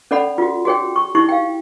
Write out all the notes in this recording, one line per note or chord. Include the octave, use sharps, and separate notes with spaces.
C#4 A4 D5 F#5 B5
F4 F#4
F#4 G#4 C#5 G5
C#6
D#4 E4 G4 C#6
F5 G5